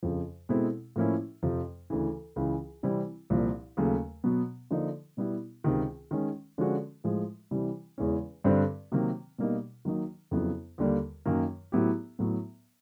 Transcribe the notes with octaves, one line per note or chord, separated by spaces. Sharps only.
F2 C#3 F3
B2 G#3 C4 E4 A4
A2 F3 A#3 C#4 E4
F2 C3 F3
D2 C#3 E3
C#2 C#3 E3
C3 E3 G3 C4 E4
C2 A#2 F3
D#2 C#3 F#3 A3
B2 F#3 B3
D3 F3 A#3 D#4
B2 G3 B3 E4
C#2 C3 D#3
D#3 G#3 C#4
D3 F3 G#3 C#4 F#4
A2 F3 G#3
C3 E3 G3
E2 C#3 E3 G#3 C#4
G2 D3 G3 C4
C3 D#3 F#3 A#3
B2 G3 A#3 D#4
D#3 F#3 A#3 D#4
F2 C#3 F#3 B3 E4
D#2 D3 G3 A#3
F#2 D#3 F#3 A#3
A2 F#3 B3 E4 G4
A2 F#3 B3